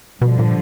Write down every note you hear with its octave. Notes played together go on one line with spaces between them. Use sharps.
G2 B2 D3 F3
A#2